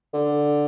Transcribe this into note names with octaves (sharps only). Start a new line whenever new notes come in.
D3